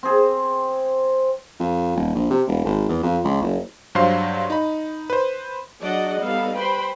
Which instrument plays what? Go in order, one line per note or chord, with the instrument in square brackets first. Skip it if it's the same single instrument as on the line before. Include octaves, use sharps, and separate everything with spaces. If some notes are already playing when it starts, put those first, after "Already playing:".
[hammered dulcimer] C4 G#4
[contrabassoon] F2
D#1
A#1
C3
E1
G#1
E2
F2
C#2
F#1
[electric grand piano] G2 F#3 C5 F5 C6
D#4 B5
B4 C5
[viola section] F#3 D4 G#4 D5 D#5 F#5
G3 B3 D#4 A4 F5
B4 C5 G5 B5 C6